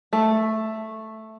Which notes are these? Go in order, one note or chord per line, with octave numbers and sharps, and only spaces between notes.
A3